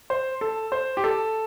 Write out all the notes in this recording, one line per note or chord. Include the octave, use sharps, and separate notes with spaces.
C5
A4
C5
G4
A4